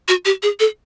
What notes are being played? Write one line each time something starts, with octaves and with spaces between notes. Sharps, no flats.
F#4
G4
G#4
A4